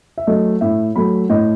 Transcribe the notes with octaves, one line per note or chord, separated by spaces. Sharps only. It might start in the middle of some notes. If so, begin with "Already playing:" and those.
E5
F#3 A3 D#5
A2 E5
F#3 A3 B5
A2 D#5